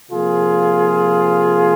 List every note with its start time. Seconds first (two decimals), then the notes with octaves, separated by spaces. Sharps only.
0.12 C3 F3 A#3 F4 G#4